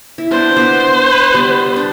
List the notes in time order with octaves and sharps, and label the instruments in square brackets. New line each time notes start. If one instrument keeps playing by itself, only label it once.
[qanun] E4
[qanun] B3 D4 [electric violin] C5
[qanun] B3 D4
G3 B3
D4